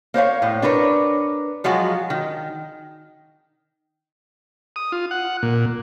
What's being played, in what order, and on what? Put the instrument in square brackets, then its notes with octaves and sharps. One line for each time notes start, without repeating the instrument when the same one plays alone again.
[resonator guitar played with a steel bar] A#3 C5 C#5 F5
A2
D4 A#4 B4 C#5
F3 F#3 G#3 F4 F#4
D#3
[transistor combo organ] D#6
F4
F#5
A#2